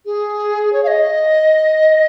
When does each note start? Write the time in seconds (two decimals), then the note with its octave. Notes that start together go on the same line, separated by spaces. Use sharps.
0.06 G#4
0.73 C#5
0.84 F5
0.87 D#5